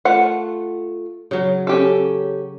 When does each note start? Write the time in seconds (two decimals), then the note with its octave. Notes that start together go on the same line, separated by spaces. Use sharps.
0.05 A3 F4 F#5
1.31 C#3 F#3
1.67 C#4 G4 A4